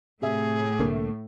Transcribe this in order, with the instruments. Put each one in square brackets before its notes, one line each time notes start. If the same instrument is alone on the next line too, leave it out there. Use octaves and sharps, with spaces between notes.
[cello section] A2 [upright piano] C3 E5 [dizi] G#4
[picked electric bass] C2 D3 A#3 [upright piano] A3